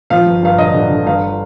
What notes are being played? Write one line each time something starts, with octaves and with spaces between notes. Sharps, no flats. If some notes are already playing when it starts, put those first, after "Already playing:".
F3 F5
G1
G1 F5
D3 D#5
D3
D3
G1 F5